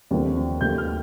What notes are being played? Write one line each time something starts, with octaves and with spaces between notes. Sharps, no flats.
D#2 D3 F3 A3 C4
D#2 D#3 A3 G6
F6